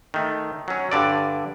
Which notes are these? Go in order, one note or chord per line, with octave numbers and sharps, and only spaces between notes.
D#3 A3
F#3 C#4
G2 D3 D5